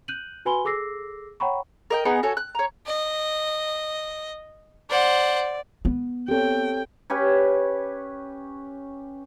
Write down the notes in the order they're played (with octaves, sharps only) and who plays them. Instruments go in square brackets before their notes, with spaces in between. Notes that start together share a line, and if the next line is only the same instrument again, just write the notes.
[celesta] F#6 G6 D#7 F#7
F#4 B4 G#5 B5 C6 G7
G#4 A4 D6 E6 A#6 C7
C#5 F#5 G5 A#5 B5 C#6
[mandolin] A#4 D#5 G5
B3 D#4 G#4 B4
F#4 A4 C#5 G#5
F#6
C#5 A#5
[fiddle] D#5
[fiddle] C5 F#5 [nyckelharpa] D5
[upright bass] B3
[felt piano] C4 C#5 [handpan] G4 A4 [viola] G5
[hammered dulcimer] C#4 G4 B4 C#5